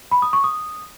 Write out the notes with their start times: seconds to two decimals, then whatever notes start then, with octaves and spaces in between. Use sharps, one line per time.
0.11 B5
0.22 D#6
0.33 C#6
0.44 D#6